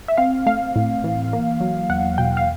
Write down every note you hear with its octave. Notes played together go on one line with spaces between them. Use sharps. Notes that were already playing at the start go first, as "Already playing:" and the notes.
E5
C4 F5
A3 F5
A2
E3
A#3
F#3
E2 F#5
B2 G5
F5